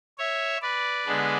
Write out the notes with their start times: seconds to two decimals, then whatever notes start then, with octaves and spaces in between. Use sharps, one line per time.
0.18 C#5 E5
0.62 B4 D5
1.05 D3 G#3 B3 D4